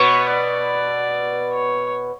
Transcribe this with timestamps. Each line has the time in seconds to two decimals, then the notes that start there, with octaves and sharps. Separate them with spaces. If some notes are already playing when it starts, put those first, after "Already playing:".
Already playing: B2 B3 C#5
0.29 D5
1.53 C#5